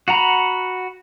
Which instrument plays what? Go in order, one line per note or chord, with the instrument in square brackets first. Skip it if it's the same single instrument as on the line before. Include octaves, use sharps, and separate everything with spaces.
[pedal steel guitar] F#4 F#5 A#5 B5